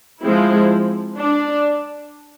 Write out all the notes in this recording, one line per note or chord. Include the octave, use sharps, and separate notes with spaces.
F3 G#3 C4 E4
D4